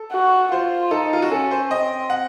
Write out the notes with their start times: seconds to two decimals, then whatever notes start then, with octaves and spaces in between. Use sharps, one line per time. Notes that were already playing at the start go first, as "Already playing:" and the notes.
Already playing: A4
0.12 F#4
0.52 F4 C5
0.91 D#4 A4
1.13 F4
1.22 F#4
1.32 C#4 A4
1.51 C5
1.70 C4 D#5
2.10 F#5